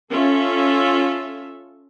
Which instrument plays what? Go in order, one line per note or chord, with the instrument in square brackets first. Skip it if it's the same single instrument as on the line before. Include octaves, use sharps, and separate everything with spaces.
[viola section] C#4 F4 A4 E5